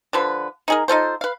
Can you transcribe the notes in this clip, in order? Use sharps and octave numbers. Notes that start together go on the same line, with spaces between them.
D3 F3 B4
D#4 G#4 A#4
D#4 F4 A4 C5
B4 F5